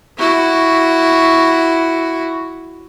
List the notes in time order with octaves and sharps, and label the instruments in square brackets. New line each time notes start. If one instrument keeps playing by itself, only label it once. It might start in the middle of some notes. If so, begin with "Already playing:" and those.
[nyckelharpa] E4 F#4